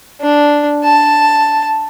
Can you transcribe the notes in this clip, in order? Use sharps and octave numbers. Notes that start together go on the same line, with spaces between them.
D4
A5